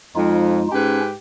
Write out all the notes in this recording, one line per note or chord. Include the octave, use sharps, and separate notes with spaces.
F2 G#3 D#4 F4
G#2 C#4 G4 B4